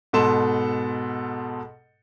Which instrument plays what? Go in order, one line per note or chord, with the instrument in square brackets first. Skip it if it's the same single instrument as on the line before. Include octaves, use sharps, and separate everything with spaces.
[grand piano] G#2 B2 A4 C6 E7